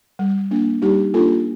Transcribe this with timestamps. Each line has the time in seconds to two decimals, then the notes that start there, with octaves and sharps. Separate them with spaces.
0.19 G3
0.51 A#3 D4
0.82 G3 D#4 G4
1.14 A#3 D4 F4 A4